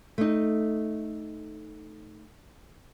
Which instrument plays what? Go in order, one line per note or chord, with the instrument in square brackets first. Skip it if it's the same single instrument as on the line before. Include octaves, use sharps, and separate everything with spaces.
[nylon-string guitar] A3 D#4